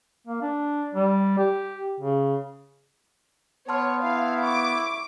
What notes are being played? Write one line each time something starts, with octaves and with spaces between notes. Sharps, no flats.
A#3
D4
G3
G4
C#3
B3 C#5 A5 C6 F6
E4 F5
C#6 D6